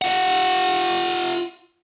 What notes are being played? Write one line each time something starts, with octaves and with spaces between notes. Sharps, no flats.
F4 F#5